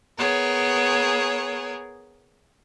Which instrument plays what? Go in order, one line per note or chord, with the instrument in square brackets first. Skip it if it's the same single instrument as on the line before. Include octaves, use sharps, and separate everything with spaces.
[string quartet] B3 G#4 A#4 C#5